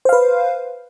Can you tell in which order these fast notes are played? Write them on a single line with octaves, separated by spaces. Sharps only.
C5 F5 B4